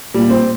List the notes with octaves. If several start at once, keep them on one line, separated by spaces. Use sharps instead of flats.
A#2 G3
C4